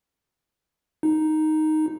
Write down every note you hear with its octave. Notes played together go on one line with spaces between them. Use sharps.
D#4